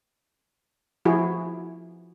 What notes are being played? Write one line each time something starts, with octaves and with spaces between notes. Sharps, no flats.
F3 E4 F#4 G#4